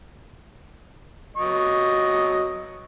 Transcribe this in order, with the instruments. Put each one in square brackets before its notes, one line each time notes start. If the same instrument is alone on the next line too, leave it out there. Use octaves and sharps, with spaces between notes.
[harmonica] F#3 D#5 C#6